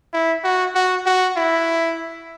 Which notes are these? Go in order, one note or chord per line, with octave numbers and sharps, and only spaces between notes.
E4
F#4
F#4
F#4
E4